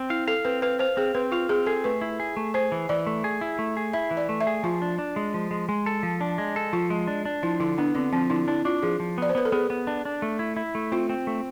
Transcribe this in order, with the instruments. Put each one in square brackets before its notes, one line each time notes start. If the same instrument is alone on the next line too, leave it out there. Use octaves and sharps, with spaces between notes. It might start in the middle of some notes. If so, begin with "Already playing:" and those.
Already playing: [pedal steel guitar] C4
[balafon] E4 [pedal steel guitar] F5
[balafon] A4 [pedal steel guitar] F5
[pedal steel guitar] C4 [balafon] B4
[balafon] B4 [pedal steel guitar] F5
[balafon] C5 [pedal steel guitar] F5
[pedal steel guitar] C4 [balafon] G#4
[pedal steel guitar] C4 [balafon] B4
[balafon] F4 [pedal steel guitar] F5
[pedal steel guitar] C4 [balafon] G#4
[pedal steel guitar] G#4 [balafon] A4
[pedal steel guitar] A3 [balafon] B4
[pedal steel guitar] E4
G#4
A3
[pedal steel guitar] G#4 [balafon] C5
[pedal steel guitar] E3
[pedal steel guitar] E3 [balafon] D5
[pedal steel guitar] A3
G#4
E4
A3
G#4
[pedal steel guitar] E4 [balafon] E5
[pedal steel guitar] E3
[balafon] D5
[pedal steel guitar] A3
[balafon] E5
[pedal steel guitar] G#4
[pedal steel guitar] F3 [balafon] F4
[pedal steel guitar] D4
D4
G#3
F3
G#3
G#3
A4
F3
D4
G#3
A4
[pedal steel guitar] F3 [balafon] F4
[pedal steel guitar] G#3
D4
D4
[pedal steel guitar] F3 [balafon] E4
[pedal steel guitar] D3 [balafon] E4
[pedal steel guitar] B3 [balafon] D4
[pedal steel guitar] D3 [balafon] C4
[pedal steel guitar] F3 [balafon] C4
[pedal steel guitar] D3 [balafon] E4
[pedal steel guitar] D4 [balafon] E4
[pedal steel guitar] D4 [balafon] F4
[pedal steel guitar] F3 [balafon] G#4
[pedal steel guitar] F3
[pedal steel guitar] B3 [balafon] D5
[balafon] C5
[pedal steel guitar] B3 [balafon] B4
[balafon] A4
[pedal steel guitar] B3 [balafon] G#4
[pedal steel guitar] B3
D4
D4
A3
E4
E4
A3
[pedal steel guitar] C4 [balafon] F4
[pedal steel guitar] C4
A3